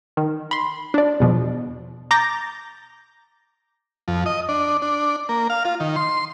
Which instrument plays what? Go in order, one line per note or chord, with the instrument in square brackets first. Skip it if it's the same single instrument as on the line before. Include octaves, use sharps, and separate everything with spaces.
[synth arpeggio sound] D#3
B5 C6
D4 D5
E2 B2 F3
A#5 D6 G6 A6 A#6
[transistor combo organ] F2
D#5
D4
D4
A#3
F5
F4
D#3
C6